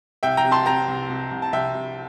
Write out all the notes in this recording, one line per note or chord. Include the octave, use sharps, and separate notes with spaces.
C2 E5 G5
G5 A#5
C3
A5 C6
C3 G5 A#5
C2
C2
C2
A5
C2 E5 G5
C2